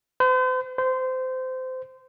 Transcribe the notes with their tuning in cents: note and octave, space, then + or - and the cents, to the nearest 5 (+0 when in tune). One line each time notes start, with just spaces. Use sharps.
C5 -45
C5 -25